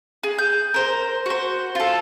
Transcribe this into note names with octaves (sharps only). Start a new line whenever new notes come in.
G#4
G6
A#4 C5
F#4 C5
F4 A4